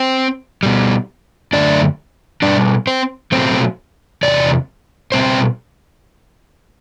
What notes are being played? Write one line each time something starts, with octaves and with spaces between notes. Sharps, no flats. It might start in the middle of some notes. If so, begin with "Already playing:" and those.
Already playing: C4 C5
B2 G3
F#2 D3 A3 D4 D5
B2 G3 D4 D5
C4 C5
B2 F#3 A3 C4 C5
E2 C3 D5
B2 G3 C4 C5